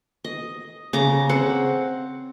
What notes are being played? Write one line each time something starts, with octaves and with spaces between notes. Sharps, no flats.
D#5
C#3 A#5 D6
C4 F#5